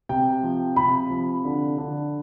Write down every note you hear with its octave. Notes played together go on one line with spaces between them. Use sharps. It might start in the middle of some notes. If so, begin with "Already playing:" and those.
C3 G5
F3
C3 B5
F3
D3
D3